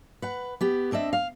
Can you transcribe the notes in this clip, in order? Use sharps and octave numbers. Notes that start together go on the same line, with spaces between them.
B4 F#5
B3 G4
C4 D4 D#5 E5
F5